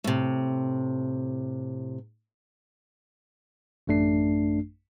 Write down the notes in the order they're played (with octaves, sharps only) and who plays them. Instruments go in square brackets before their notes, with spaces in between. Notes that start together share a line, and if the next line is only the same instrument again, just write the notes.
[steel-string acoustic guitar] A2 C3
[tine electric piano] A1 F#2 A3 D4 C7